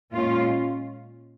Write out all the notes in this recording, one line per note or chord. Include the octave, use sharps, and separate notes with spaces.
A#2 G#3 C#4 F4